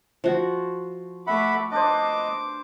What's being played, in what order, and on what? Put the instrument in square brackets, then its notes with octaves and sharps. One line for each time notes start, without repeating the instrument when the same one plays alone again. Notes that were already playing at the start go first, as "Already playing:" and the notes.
[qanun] F3 F#4
[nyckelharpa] A3 D6 [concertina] E5 F#5 B5
[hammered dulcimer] D4 B4 C5 [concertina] D#5 [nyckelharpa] D6